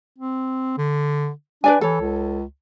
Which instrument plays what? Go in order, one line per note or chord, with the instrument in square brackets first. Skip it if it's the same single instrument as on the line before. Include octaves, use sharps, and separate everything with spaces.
[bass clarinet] C4
D3
[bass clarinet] D4 [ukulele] B4 D5 G#5
[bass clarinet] E3 [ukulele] A4 C#5
[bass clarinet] C#2